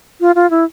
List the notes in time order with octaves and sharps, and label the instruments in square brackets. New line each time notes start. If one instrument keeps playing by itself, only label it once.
[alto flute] F4
F4
E4